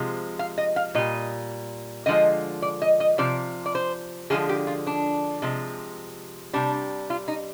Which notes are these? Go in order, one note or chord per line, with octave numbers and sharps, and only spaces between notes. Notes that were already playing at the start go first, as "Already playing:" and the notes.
Already playing: C3 F3 G#3
F5
D#5
F5
A#2 G3 D#5
D3 F3 G#3 D#5
D5
D#5
D#5
C3 F3 D5
D5
C5
D3 F3 G#3 G#4
G4
F4
D4
C3 F3 G#3
C3 G3 D4
F4
D#4